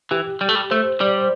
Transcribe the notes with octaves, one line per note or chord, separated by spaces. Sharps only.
E3 G4
G3
A3
G3
A3 C5
G3 D5
C5